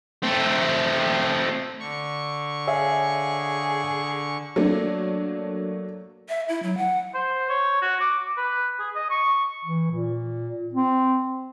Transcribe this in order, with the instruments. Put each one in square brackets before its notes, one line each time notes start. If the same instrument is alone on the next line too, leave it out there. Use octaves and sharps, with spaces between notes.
[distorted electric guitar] A3 C4
[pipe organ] D3 C#6
[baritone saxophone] G#4 [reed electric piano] C#5 E5 F5
[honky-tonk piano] F#3 A3 A#3 D4
[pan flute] E5
E4
F#3
F#5
[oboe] C5
C#5
F#4
D6
B4
G#4
D#5
C#6
[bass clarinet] E3
A#2
C4